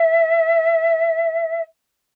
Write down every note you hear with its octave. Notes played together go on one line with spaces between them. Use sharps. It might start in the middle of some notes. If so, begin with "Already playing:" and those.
Already playing: E5